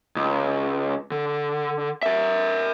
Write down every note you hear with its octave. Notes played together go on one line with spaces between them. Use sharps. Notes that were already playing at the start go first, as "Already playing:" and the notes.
C#2
D3
A#4 E5